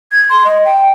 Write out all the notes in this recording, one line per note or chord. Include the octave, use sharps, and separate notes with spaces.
G#6
C6
D#5
G5